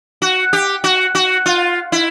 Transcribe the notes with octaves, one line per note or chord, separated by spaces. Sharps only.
F#4
G4
F#4
F#4
F4
E4